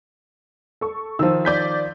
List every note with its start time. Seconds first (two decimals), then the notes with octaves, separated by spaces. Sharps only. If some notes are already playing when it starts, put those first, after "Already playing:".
0.81 A4 C#6
1.19 D#3 F3 E6
1.45 D5 G6 B6